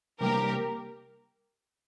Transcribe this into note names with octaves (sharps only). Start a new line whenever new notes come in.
C3 G3 A#3 G4 A#4